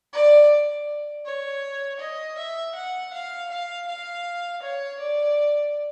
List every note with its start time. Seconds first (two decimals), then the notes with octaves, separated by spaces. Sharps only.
0.13 D5
1.26 C#5
2.00 D#5
2.38 E5
2.75 F#5
3.13 F5
3.50 F5
3.87 F5
4.62 C#5
5.00 D5